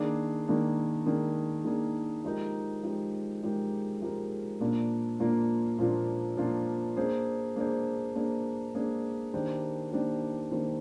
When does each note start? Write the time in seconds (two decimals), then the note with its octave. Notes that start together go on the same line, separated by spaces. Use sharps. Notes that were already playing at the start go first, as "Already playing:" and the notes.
Already playing: D#3 A#3 D4 G#4
0.47 D#3 A#3 D4 G#4
1.06 D#3 A#3 D4 G#4
1.65 D#3 A#3 D4 G#4
2.24 F3 G#3 D#4 G4 A#4
2.83 F3 G#3 D#4 G4 A#4
3.42 F3 G#3 D#4 G4 A#4
4.02 F3 G#3 D#4 G4 A#4
4.61 A#2 F3 A#3 D4 F4
5.19 A#2 F3 A#3 D4 F4
5.79 A#2 F3 A#3 D4 F4
6.37 A#2 F3 A#3 D4 F4
6.97 A#3 D4 G#4 C5
7.56 A#3 D4 G#4 C5
8.15 A#3 D4 G#4 C5
8.75 A#3 D4 G#4 C5
9.33 D#3 A#3 D4 G4 C5
9.92 D#3 A#3 D4 G4 C5
10.51 D#3 A#3 D4 G4 C5